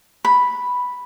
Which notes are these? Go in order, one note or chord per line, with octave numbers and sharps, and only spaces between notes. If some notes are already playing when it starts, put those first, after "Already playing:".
B5